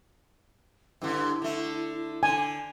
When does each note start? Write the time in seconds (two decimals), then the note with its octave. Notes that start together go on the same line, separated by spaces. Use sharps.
1.02 G2 D3 E4
1.42 D3 A3
2.23 D3 G#5